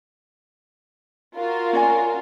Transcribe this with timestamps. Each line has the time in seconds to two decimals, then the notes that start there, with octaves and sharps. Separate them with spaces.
1.35 F4 F#4 A#4
1.73 C#4 D5 G#5